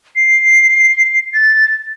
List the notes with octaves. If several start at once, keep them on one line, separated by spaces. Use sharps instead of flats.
C7
A6